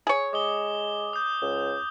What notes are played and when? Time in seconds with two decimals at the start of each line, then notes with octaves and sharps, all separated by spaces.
0.07 G#4 C#5
0.33 G#3 D6 D#6 G7
1.13 D#6 G6
1.42 C#2